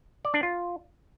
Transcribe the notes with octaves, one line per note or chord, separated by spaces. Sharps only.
D5
D4
F4